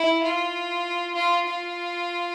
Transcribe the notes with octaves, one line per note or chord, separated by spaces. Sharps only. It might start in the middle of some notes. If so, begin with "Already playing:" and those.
Already playing: E4
F4
F4
F4